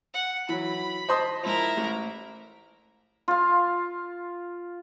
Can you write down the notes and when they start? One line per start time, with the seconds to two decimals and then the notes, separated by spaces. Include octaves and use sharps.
0.14 F#5
0.49 E3 F#3 B5
1.09 C5 D#5 A5 C6 D#6
1.43 G#2 F3 E4 A#4
1.77 A1
3.28 F4 F5